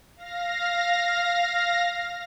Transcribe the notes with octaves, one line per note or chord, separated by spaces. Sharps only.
F5 A#6